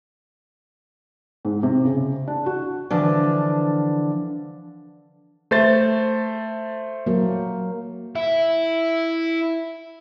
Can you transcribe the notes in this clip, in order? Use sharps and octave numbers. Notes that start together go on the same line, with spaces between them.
G#2
C3
C#3
D4
F#4
D3 E3 F3 D4
A3 C5 A6
F#3 A#3
E4 E5